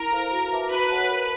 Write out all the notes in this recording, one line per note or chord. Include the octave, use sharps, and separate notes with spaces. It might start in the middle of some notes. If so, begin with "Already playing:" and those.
Already playing: E4 A#4
A4 C5 F5 A#5
F#4
B4 E5 A5 D6
F#4 B4
A4 C#5 F#5 A5
A#4